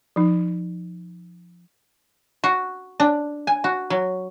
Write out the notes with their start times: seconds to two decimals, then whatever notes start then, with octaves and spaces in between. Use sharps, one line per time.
0.16 F3 D#4
2.44 F#4
3.00 D4
3.47 G#5
3.64 F#4
3.90 F#3